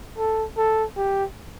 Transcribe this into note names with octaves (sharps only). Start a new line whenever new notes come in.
A4
A4
G4